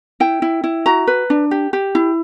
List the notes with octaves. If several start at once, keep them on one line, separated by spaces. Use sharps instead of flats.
E4 G5
E4
E4
F#4 A#5
B4
D4
G4
G4
E4